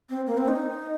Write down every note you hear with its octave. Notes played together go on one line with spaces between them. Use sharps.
C4
A#3
C4
D#4